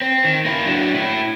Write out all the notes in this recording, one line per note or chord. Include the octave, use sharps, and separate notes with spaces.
C4
D#3
A#3 E4
F#3 D4
A2 E4